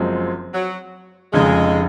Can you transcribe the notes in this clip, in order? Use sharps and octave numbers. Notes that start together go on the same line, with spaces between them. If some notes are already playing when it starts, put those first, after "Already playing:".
Already playing: F#1 F#2 F3 G#3 C4
F#3
F1 F2 C#3 G#3